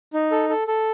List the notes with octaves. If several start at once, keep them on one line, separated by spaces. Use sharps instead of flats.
D#4
A4
A4
A4